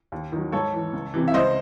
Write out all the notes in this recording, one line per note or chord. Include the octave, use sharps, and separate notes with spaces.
D#2
D#3 F#3
G#2 A4 C#5
E3
C#2
C3 E3
E5
C#2 C5 D#5